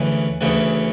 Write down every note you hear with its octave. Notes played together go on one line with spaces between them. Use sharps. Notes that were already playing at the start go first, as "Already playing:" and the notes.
Already playing: D2 C#3 E3
D2 C#3 E3